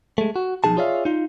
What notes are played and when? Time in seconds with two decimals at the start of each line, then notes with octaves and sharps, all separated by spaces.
0.18 G#3 A3
0.36 F#4
0.64 B1 F#2 F3 D#4 G#4 A5
0.77 F4 G#4 C#5 D5 E5 F5
1.05 D#4 F4